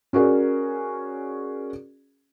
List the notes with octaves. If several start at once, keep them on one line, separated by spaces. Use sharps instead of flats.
C#4 F#4 G#4 A#4 D5